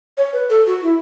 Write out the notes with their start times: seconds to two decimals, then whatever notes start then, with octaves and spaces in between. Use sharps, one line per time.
0.17 C#5
0.33 B4
0.50 A4
0.66 F#4
0.82 E4